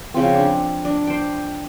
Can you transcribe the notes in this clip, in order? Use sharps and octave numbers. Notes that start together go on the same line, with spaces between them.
C#3 F3 C4
D4
D4
C5 G5